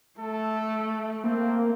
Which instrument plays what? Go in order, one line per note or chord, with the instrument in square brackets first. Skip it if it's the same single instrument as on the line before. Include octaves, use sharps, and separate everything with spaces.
[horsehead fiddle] A3 [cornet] A4
[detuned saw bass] A#3 [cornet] C4